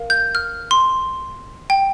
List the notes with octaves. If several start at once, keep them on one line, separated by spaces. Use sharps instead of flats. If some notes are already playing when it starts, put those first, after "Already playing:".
Already playing: A#4 F5
G6
F6
C6
G5